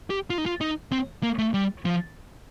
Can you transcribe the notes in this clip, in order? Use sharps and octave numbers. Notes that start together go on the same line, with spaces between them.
G4
F4
D#4
F4
D#4
C4
A#3
A3
G3
F3